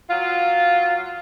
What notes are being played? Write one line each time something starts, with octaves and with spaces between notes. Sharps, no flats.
F#3 F4